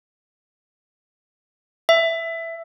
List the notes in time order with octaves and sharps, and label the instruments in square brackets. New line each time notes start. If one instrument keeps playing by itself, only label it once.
[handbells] E5